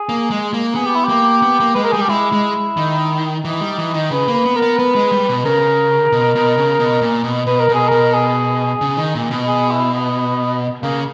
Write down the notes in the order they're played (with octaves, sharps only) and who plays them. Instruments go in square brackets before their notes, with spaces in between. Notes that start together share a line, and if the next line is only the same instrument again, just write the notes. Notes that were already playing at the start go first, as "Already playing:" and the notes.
Already playing: [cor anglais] G#4
[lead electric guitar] A#3
G#3
A#3
[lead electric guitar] B3 [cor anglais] G#4
[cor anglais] G4
E4
[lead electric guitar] A#3 [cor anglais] G4
[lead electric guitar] B3
A#3
[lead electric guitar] G#3 [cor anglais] B4
[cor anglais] A#4
[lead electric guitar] G3 [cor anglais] G#4
[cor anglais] G4
[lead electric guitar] G#3 [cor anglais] E4
[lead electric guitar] G#3
D#3
[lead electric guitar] E3 [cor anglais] D#4
[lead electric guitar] G3
E3
D#3
[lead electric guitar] C#3 [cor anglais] B4
[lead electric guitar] A#3
[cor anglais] B4
[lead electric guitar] B3
[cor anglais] A#4
[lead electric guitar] B3
[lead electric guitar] B3 [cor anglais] B4
[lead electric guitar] G#3
G3
B2
[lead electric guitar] C#3 [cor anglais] A#4
[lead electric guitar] B2
B2
C#3
B2
A#2
B2
[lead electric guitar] B2 [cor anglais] B4
[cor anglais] A#4
[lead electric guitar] B2
[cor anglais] G#4
[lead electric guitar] B2 [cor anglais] A#4
[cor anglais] G#4
[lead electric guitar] C#3
D#3
A#2
B2
[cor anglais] G#4
E4
B3
[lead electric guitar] C#3 [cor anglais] A#3